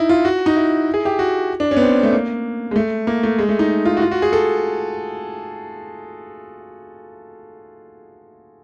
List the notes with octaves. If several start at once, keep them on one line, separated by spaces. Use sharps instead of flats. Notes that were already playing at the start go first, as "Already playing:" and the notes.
Already playing: D#4 E4
F4
F#4
D#4
E4
G#4
G4
F#4
D4
C#4
B3
C4
A3
A#3
G#3
A3
A#3
A3
G#3
A3
D#4
F4
F#4
F4
F#4
G#4
A4